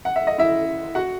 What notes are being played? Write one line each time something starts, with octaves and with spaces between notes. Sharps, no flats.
F#5
E5
D#5
E4 E5
F#4 F#5